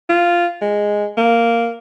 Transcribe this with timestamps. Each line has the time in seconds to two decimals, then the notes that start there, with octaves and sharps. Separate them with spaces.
0.09 F4
0.62 G#3
1.17 A#3